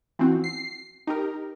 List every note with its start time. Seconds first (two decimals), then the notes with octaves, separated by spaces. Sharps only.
0.19 E3 F3 C4 F#4
0.44 C7
1.07 D#4 G4 A#4